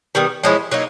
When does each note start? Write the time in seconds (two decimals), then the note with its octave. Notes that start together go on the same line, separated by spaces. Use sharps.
0.15 D#3 G3 B3
0.44 F3 G#3 C#4 E4
0.71 F#3 A#3 D#4